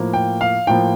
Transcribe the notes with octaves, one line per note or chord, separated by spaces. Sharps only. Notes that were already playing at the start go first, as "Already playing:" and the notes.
Already playing: A2 F3 A#3
G5
F5
A2 F3 A#3 G5